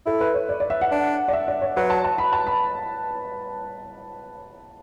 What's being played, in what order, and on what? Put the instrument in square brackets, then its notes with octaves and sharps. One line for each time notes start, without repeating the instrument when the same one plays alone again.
[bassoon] E4 [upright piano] A4
[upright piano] B4
C#5
D5
D5
E5
F#5
[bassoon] D4
[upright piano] D5
E5
D5
C#5
[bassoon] F#3 [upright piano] B4
[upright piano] A5
A5
B5
A5
B5